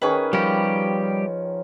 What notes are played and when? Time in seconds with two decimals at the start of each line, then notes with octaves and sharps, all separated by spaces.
0.02 D#3 C#4 G#4 B4
0.33 F3 G3 G4